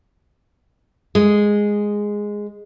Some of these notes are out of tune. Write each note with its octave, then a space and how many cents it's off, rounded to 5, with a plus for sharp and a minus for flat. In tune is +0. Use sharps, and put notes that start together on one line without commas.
G#3 -5